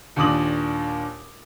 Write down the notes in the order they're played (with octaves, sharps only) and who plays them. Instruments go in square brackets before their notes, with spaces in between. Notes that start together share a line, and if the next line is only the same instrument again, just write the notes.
[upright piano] D#2 A#2 D4 D6 D#6 F#7